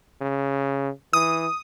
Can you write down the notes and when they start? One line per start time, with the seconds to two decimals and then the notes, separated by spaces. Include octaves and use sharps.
0.22 C#3
1.13 E3 D#6